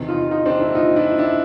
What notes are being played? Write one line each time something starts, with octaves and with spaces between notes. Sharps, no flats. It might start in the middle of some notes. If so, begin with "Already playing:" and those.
Already playing: E2 C3 D#3
D#4 F4
D#4 F4
C4 D4
D4 E4
D#4 F4
D4 E4
D4 E4